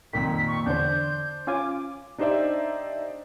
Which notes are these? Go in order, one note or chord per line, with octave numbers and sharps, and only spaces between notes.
F2 A#2 D#3 B6
C#6
E2 D3 D4 C5 G6
C#4 F4 G#5 D6
D4 D#4 G4 C5 D5 E5